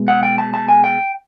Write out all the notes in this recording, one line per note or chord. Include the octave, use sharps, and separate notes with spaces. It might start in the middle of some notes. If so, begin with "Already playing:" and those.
Already playing: B2 G#3
F#5
G5
A5
A5
G#5
G5